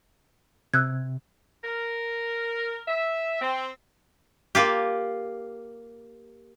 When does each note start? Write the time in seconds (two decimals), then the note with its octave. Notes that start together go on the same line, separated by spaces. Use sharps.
0.74 C3 E6 F#6 G#6
1.64 A#4
2.88 E5
3.42 C4
4.55 A#3 F4 G4